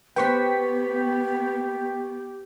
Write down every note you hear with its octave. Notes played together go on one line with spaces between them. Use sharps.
B3 G4 B4 C5 G5 C#6 B6